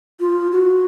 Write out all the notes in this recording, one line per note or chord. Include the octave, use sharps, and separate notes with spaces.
F4
F#4